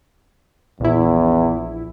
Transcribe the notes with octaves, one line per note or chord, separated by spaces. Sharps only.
A#1 E2 E4